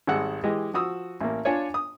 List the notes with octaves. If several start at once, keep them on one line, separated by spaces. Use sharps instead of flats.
G#1 G3 G#3 F#5 E6
E3 G#3 G4 D#5
F3 F#4 D#6 E6
A1 A#3
D4 F4 C#5 G#5
D#6